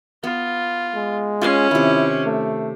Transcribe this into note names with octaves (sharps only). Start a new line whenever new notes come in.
B3 F4
G#3
C#4 F4 G#5 C6
C3 D#3 E4
A3